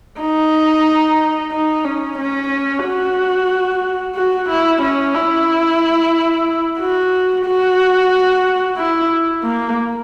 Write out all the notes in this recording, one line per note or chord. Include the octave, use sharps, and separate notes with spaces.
D#4
D#4
C#4
C#4
F#4
F#4
E4
C#4
E4
F#4
F#4
E4
A#3